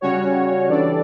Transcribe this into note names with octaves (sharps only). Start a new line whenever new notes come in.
C#3 G3 C#4 F#4 C#5
E3 G3 D4 A4 D5